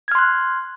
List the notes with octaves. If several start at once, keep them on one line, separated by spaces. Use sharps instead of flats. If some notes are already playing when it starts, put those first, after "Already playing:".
C6 F6 F#6 G#6